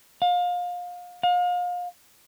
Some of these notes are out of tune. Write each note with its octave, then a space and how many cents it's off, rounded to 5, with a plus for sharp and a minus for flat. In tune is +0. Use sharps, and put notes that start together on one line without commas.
F5 +30
F5 +35